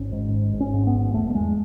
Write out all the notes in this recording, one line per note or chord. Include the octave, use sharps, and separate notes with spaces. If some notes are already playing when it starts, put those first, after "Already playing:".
Already playing: G#1 C#4
G#2
G#1
G#1
C#4
G#2
B3
G#1
E1 A3
A3
E2 G#3